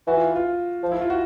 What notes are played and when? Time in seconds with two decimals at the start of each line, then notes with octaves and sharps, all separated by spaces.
0.07 E3 F#4
0.17 F4
0.36 F4
0.83 F3
0.92 E4
1.01 F4
1.10 F#4